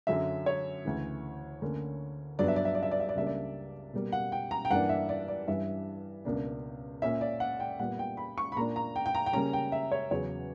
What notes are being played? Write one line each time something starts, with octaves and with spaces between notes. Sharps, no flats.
F#2 D3 F#3 C#4 E5
C#5
D2 C#3 E3
D2 D3 A#3 C#4
G2 F#3 B3 D4 D5
E5
D5
E5
D5
E5
D5
E5
D5
C#2 C#3 G3 A#3 D4 E5
D5
B2 G3 A#3
F#5
G5
A#5
G5
G2 E3 A#3 D4 F#5
E5
D5
D5
G2 E3 G3 C#4 E5
C#2 B2 A#3 D4
A#2 A#3 C#4 E5
D5
F#5
G5
A#2 G3 B3 F#5
G5
B5
C#6
B5
A#2 A#3 D4 A#5
A#5
G5
G5
A#5
G5
C#3 G3 A#3 C#4 A#5
G5
E5
C#5
E2 C#3 F#3 C#4 C#5